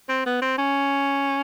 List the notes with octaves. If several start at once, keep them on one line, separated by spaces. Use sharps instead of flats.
C4
B3
C4
C#4